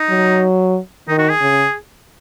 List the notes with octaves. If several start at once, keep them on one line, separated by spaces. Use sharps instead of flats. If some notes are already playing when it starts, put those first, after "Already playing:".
Already playing: D#4
F#3
D#3 D#4
F#4
G#4
C#3